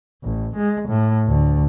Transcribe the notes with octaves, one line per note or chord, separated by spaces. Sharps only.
A1
G#3
A2
D2